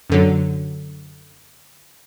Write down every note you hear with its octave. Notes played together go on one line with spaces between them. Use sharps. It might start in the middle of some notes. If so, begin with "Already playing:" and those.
F#2 D3 F#3